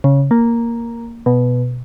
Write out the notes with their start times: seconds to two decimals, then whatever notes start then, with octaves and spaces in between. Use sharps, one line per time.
0.04 C#3
0.31 A#3
1.26 B2